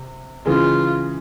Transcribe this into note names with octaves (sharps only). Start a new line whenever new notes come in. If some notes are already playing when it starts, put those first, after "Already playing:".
Already playing: C3
C#3 E3 G#3 F4